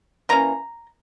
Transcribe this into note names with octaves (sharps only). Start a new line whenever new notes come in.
E3 A#3 C#4 A#5